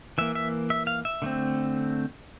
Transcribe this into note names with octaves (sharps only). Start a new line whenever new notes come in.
E3 A#3 E5
E5
E5
F5
E5
D3 A3 C4